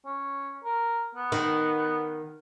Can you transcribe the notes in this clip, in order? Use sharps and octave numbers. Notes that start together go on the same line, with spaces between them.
C#4
A#4
B3
D#3